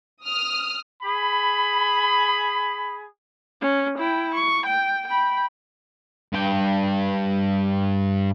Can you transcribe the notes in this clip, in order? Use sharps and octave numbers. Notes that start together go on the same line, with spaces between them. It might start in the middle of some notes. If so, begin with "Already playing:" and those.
D#6 F6
G#4 B5
C#4
E4 G5
C#6
G5
G5 B5
G2 G5